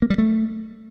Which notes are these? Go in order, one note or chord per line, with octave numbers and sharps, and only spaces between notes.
A#3
G3
A3